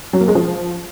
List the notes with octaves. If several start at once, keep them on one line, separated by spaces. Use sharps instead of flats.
F#3
A#3
G#3
F3